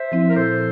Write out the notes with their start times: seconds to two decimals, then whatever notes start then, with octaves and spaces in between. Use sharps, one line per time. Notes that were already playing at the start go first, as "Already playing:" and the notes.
Already playing: C5 E5
0.12 F3 C4 E4
0.29 A#4
0.36 A#2 A4 C5